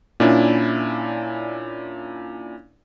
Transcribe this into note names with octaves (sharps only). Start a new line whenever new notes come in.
A#2 C#4 D4 E4